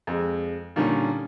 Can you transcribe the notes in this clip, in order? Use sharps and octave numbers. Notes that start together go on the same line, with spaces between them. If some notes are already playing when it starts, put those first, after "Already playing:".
F2 G#3
A#2 D3 D#3 G3 C#4